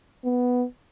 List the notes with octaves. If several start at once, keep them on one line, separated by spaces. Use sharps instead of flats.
B3